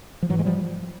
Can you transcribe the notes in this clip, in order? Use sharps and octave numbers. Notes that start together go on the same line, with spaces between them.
F3
G#2 E3 F#3
G#3
F3 G3